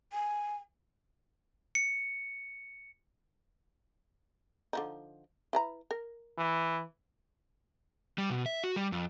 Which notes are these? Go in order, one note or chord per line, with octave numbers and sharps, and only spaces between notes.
G#5
C#7
D3 F3 D#4
E4 B4 A#5
A#4
E3
G3
B2
E5
F#4
G3
F2